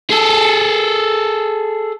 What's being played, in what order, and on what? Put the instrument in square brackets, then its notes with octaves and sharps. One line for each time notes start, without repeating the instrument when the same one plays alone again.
[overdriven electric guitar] G#4 A4